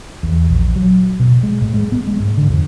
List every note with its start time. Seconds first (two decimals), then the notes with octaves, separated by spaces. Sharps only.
0.23 E2
0.49 A#1
0.76 F#3
1.20 B2
1.43 G#3
1.61 A2
1.74 G#3
1.92 B3
2.07 G#3
2.20 G#2
2.37 D3
2.50 F2